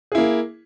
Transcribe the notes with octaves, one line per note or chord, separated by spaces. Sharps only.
A#3 E4 G#4